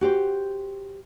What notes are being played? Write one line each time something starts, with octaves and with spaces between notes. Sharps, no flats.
F#4 G4 C5